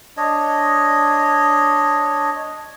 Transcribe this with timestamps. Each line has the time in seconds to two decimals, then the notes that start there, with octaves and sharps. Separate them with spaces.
0.17 D4 C#5 D#5